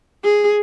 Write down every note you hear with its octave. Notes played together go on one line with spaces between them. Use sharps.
G#4